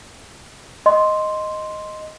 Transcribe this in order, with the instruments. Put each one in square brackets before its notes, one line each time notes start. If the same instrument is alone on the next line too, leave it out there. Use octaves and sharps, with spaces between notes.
[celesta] D#5 C6